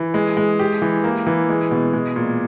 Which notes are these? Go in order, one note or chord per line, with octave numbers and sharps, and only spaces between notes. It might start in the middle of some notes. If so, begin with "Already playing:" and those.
Already playing: E3
G#3
G#3
G4
E3
A#3
E3
G#3
B2
G#3
A#2